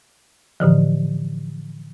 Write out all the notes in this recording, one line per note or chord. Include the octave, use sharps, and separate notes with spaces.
A2 D3 E3 F3